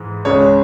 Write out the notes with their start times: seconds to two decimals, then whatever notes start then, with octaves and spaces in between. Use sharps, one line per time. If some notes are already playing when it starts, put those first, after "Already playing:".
Already playing: G#2 E3 G#3
0.25 C#2 C#3 G#3 C#5